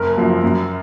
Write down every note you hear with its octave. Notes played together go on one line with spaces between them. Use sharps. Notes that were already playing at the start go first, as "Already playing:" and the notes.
Already playing: F#1 A#4
F#2 F3 A#3
F#2